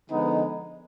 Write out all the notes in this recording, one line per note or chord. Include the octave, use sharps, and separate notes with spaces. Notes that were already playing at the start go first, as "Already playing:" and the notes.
D3 F3 G#3 B3 D#4